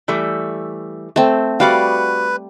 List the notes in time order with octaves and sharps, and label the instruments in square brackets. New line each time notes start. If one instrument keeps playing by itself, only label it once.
[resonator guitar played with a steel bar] E3 G3 A3
[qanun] A3 C4
[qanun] G3 D5 D6 [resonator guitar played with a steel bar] F#4 F5 [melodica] B4